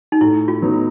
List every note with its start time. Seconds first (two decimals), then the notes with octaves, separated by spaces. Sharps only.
0.12 D#4
0.21 A2 E4
0.48 F4
0.62 F#3 B3 D#4